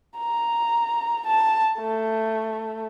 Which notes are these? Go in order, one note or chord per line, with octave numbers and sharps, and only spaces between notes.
A#5
A5
A3